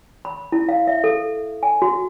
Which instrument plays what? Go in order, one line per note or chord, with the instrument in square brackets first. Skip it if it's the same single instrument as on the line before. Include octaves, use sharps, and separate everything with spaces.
[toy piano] B5
E4
F5
E5
A4
G#5
F#4